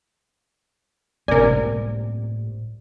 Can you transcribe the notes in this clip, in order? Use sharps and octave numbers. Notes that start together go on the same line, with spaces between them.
G1 C#2 A2 C3 A#3 A#4 D5 G#5